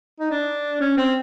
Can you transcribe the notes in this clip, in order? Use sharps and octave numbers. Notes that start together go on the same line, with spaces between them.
D#4
D4
C#4
C4